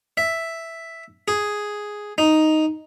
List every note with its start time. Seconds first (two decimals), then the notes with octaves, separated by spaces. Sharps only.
0.17 E5
1.28 G#4
2.18 D#4